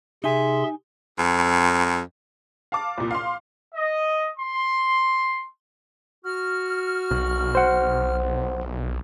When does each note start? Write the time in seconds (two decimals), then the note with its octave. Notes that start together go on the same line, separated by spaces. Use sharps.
0.24 C3 D#4 G#4 E5 G#5 C6
1.18 F2
2.72 F5 A5 D6
2.98 C2 A#2
3.11 F5 C6
3.74 D#5
4.38 C6
6.25 F#4 F6
7.11 B1
7.55 C5 F#5